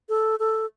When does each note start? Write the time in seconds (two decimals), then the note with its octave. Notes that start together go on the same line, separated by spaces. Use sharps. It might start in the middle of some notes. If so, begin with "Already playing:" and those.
0.09 A4
0.39 A4